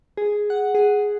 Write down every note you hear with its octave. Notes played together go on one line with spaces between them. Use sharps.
G#4
F#5
G#4